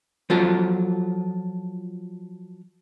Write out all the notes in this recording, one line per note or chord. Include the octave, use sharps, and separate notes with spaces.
F3 F#3 F4 A4